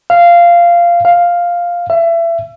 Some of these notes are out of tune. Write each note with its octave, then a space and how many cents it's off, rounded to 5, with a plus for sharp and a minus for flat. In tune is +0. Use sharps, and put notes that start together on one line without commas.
F5 -15
F5 +0
E5 +30